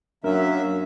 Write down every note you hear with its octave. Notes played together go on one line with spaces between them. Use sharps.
F#2 F#3 A#3 D4 A#4 E5